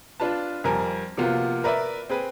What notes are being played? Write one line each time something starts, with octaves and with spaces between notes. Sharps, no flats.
D4 F4 B4 A5
F2 G3 A#4 G#5
C3 F3 A#3 B3 F4 F#4
A#4 B4 D5 E5
C4 G#4 B4